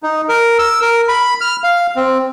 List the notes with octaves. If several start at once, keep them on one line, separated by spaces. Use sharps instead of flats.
D#4
A#4
E6
A#4
B5
F6
F5
C4